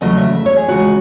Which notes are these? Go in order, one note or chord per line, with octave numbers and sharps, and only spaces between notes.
E2 C#3 F#3 A3 D#5
E5
E5
C#5
G#4
E2 C#3 G#3 F#4